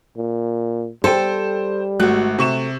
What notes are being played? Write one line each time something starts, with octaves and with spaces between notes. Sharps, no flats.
A#2
G3 A4 C5 G5
G#1 A3 F#4 F#6
C3 C#6 E7